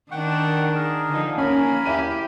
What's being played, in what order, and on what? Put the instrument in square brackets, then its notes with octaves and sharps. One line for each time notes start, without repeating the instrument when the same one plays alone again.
[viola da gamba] D#3 D4 [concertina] F#5 G5 C#6
[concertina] G#4 A#4
[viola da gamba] D3 F3 D#4
[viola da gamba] A#3 [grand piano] C#4 C#5 [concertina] A#4 G#5 B5
[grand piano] E4 E5 D#7 [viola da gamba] G4